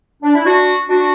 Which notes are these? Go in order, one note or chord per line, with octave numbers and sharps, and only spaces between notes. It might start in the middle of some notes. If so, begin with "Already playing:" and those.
D4
E4
D4 F#4
D4 F#4